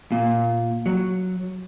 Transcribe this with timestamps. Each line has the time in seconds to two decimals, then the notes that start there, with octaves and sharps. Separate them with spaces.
0.12 A#2
0.86 F#3